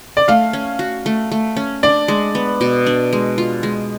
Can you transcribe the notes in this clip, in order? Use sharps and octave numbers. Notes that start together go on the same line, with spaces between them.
D5
A3 F5
C#4
F#4
A3
A3
C#4
D4 D5
G#3
B3
B2
D4
G#3
F4
G#3